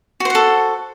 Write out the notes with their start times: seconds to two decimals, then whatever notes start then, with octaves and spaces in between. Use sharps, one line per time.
0.20 F#4
0.25 C5
0.30 F#5
0.35 A4